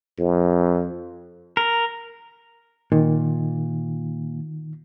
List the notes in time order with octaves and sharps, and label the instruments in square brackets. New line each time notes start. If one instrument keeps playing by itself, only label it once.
[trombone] F2
[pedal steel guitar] A#4
[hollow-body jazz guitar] A#2 [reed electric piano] D#3